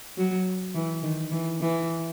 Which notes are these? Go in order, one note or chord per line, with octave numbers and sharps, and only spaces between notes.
F#3
E3
D#3
E3
E3